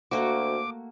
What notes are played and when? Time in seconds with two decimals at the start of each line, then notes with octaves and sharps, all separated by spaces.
0.11 D2 A3 A#3 F#4 D6